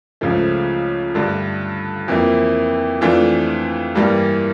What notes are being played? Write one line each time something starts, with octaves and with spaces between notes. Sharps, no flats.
C#2 C#3 F3 A3
G2 D3 A3 D4
F2 E3 A#3 E4
F2 E3 A3 D4 F4
G2 E3 G3 A#3